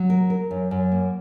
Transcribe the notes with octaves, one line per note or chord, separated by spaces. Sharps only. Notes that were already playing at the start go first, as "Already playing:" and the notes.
Already playing: F#3
A#4
A#4
F#2
F#2
A#3